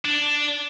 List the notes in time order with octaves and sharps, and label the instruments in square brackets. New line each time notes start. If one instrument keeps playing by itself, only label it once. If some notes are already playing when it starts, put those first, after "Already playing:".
[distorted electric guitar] D4